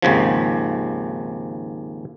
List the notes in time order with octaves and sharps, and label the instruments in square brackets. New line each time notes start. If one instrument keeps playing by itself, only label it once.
[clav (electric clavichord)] G#1 D#2 C#3 F3